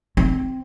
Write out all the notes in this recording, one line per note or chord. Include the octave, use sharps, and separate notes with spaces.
C4